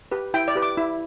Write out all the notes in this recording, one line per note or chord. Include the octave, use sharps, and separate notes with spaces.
G4 B4
E4 G5
D5
G4 B4
D6
E4